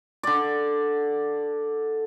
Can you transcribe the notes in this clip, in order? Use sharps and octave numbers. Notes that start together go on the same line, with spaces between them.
D3 D5